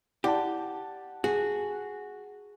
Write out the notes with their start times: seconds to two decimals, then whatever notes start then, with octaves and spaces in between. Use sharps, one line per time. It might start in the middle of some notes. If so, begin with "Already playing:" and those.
0.24 E4 G4 D5 F#5 A5
1.24 F#4 G#4